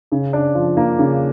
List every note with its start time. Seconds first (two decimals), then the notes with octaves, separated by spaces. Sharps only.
0.12 C#3
0.33 D4
0.55 F3
0.77 A#3
0.99 C#3